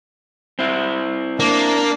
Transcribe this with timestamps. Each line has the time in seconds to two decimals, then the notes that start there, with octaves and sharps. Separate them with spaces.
0.59 C4 E4
1.40 A#3 D4